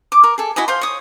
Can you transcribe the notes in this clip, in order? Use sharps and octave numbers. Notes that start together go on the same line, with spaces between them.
D6
A#4
G#4 A4
E4 F#4 D#5 G#5
C5 F5 C6
C#5 D#6